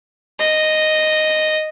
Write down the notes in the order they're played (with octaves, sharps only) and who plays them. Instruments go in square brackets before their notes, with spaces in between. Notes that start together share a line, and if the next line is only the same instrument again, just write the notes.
[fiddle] D#5